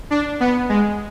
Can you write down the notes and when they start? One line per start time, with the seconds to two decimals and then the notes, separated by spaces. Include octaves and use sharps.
0.11 D4
0.40 B3
0.69 G#3